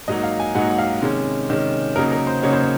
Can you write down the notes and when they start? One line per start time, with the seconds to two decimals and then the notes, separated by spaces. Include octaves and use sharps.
0.08 G#2 F#3 A#3 D#4 D#5
0.23 F5
0.40 G#5
0.55 G#2 F#3 A#3 D#4 F#5
0.70 F#5
0.78 F5
1.02 C3 D#3 G#3 C#4
1.49 C3 D#3 G#3 C#4
1.96 C#3 F#3 A#3 D#4 A#4
2.12 A#4
2.27 C5
2.42 C#3 F#3 A#3 D#4 C#5
2.53 C5
2.62 C#5